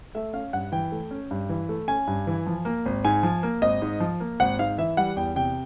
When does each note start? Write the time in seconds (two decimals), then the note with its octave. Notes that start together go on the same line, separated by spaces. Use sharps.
0.15 A3 E5
0.33 C#4 F5
0.53 G2 F#5
0.72 E3 G5
0.92 A3
1.11 C#4
1.31 G2
1.49 E3
1.69 A3
1.88 C#4 G#5
2.07 G2
2.27 E3
2.46 F3
2.65 A#3
2.86 G#1
3.05 G#2 G#5
3.23 F3
3.43 A#3
3.62 G#1 D#5
3.82 G#2
4.00 F3
4.20 A#3
4.40 G#1 F#5
4.59 G#2 F5
4.78 E3 E5
4.97 G3 F#5
5.16 E2 G5
5.36 C3 G5